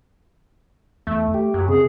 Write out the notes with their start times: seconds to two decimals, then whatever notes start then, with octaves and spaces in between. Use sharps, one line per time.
1.07 E2 A3
1.34 G4
1.54 F#2
1.68 C3 G#4